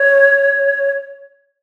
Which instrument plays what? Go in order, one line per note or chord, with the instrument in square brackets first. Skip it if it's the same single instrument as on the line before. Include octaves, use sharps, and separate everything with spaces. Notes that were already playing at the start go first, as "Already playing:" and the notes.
Already playing: [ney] C#5